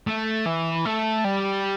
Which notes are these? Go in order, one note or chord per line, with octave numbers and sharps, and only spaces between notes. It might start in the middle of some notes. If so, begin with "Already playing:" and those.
A3
E3
A3
G3